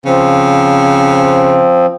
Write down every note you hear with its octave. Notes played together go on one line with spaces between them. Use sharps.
C#3 F3 C4